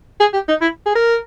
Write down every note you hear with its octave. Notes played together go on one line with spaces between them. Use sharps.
G#4
G4
D#4
E4
G#4
A#4